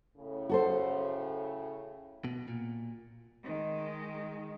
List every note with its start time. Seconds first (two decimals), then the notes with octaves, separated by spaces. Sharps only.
0.17 A2 C#3
0.49 F#4 A4 C5
2.24 B2
2.48 A#2
3.43 D#3 G#3